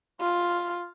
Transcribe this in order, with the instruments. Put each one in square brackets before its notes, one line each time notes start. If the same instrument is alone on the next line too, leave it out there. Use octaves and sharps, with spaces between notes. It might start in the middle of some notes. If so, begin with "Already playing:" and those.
[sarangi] F4